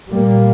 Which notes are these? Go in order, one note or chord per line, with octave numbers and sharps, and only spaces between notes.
A#2 G3 A#3